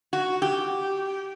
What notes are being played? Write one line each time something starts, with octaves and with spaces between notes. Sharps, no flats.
F#4
G4